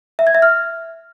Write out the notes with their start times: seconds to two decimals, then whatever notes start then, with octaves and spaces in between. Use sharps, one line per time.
0.19 E5
0.27 G#6
0.35 E5
0.42 F6